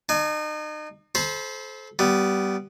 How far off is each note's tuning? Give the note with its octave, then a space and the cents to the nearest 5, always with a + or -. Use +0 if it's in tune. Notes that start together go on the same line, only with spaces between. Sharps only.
D#4 -35 G#5 +35
A4 -30 C5 +0 B5 -30
G3 -15 B3 +0